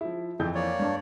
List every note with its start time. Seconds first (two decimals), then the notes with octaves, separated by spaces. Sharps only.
0.01 F3 E4
0.39 F2 E3 C4 G6
0.55 A#3 C#5 D5
0.80 G2 A5